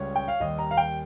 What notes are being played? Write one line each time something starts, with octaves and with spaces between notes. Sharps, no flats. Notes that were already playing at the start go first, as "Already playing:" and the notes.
Already playing: C#2 C#3 G3 C#5
G5
F5
D#2 D#3 G3 D#5
A#5
F5
G5